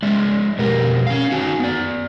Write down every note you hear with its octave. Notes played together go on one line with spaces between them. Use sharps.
G#3 D5 E5
F2 B2 G4 A#4
C#4 F5
D#4 F#4 G#5
B3 D5